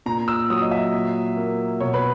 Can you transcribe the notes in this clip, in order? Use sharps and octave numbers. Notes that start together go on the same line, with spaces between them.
A#2 A#5
E6
F#3 D#6
D#5
E5
A#2
A#3
B2 C#5
B4